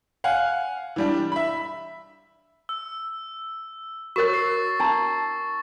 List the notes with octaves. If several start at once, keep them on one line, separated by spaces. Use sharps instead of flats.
F5 F#5 G#5
E3 G3 D4
E5 B5
E6
F#4 A#4 C#5 C#6 A6
C7
D4 A5 A#5